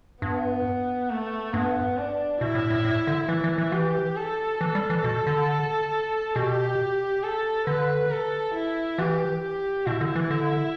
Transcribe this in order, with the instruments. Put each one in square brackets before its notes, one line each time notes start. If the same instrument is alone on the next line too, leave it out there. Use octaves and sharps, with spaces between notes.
[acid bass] G2 [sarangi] B3
[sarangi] A3
[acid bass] G2 [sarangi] B3
[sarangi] D4
[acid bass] B2 [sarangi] E4
[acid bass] A2
A2
A2
D3
[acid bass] E3 [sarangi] E4
[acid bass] E3
E3
[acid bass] E3 [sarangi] G4
[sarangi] A4
[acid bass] E3 [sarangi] A4
[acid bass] G3
E3
B2
D3
[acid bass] B2 [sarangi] G4
[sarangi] A4
[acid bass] D3 [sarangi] B4
[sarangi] A4
E4
[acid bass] E3 [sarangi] G4
[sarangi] G4
[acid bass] B2 [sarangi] E4
[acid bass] D3
E3
D3